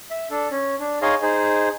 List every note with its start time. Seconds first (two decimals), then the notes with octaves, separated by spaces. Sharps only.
0.10 E5
0.31 D4 A4
0.51 C#4
0.79 D4
1.02 D#4 G#4 C#5 D#5 F5 C6
1.22 D#4 G#4 C5